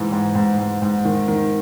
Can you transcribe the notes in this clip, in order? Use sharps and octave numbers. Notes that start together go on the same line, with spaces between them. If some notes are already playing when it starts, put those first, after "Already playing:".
Already playing: G#2 E3
G#2
G#2
G#2
G#2
D#3
D#3